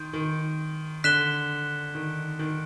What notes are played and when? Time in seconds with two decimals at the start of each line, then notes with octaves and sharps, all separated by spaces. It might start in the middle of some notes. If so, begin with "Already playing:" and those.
Already playing: D#3 C6 G6
0.13 D#3
1.04 D3 F#6 B6 E7 G7
1.95 D#3
2.39 D#3